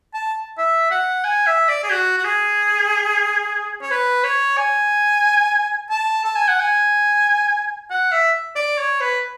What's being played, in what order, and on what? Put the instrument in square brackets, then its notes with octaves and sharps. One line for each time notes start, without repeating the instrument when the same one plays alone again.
[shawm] A5
E5
F#5
G#5
E5
D5
G#4
F#4
F#4
G#4
C#5
B4
C#5
G#5
A5
A5
G#5
F#5
G#5
F#5
E5
D5
C#5
B4